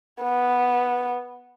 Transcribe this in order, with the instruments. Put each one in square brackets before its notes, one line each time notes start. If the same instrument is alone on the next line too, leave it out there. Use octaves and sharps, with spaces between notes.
[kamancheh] B3